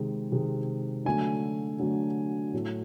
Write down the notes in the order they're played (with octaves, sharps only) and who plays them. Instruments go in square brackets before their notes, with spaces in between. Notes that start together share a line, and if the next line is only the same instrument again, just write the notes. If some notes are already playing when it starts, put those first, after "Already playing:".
Already playing: [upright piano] C3 D#3 G#3
C3 D#3 G#3
D3 F#3 A3 G#5
D3 F#3 A3
A2 F#3 A3